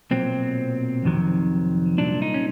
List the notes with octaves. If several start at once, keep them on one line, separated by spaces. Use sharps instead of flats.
B1 A#2 F#3 C4
F2 C3 D#3 F#3
C2 A#2 F#3 D4
D#4
C#4